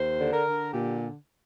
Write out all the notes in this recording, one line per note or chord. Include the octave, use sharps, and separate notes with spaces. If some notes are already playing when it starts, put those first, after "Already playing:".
Already playing: D#2 C5
D3
A#4
D3
A#2 G4